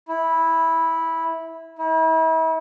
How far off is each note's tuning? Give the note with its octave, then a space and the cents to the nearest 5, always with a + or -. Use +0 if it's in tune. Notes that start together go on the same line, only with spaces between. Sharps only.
E4 -10
E4 -40